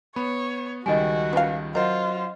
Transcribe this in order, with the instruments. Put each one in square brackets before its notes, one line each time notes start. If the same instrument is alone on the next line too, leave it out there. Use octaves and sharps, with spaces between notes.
[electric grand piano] B3 [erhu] C#5 [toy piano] B5
[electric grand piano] C#2 D#3 G3 [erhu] F#4 [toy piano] D#5 G5 G#5
[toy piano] C#4 F4 A5 [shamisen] B4 F5
[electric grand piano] F#3 C5 F#5 [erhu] F4 [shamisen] A#4 [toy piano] D#5